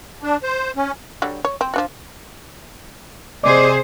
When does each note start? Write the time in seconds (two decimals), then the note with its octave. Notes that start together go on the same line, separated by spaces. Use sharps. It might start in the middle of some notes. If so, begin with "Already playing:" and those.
0.22 D4
0.43 C5
0.76 C#4
1.22 D3 F#3 G3
1.45 C#5
1.61 C4
1.74 F3 D4 F#4
3.43 C3 G#4 C5 D5 D#5 D6